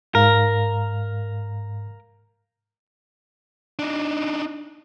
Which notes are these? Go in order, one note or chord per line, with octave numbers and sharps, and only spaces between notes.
G#2 A#4 F5
D4 D#4